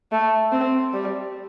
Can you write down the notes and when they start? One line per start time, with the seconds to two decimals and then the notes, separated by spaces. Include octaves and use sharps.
0.12 A3
0.52 C4
0.93 G3